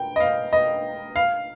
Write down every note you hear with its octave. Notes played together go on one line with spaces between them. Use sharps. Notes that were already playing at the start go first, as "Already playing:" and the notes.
Already playing: G5
D#5
F5
D#5
F5